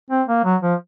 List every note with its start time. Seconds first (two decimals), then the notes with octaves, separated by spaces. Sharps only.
0.10 C4
0.28 A#3
0.44 F#3
0.62 F3